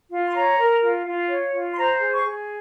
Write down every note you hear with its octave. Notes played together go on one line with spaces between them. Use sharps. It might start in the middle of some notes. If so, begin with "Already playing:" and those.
F4
C6
C#5 A#5
A#4
F4
F4
C#5
F4
C6
C5 A#5
G#4
C#6
G#4